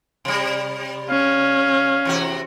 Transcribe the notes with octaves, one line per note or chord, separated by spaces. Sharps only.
C3 G3
C#4 F5
E2 C3 F#4